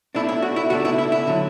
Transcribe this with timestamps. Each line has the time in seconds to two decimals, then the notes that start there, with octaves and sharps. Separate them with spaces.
0.15 B2 A3 D4 E4
0.29 E4
0.42 F#4
0.56 E4
0.70 C#2 B2 A3 D4 F#4
0.85 E4
0.98 E4
1.12 E4
1.27 D3 F#3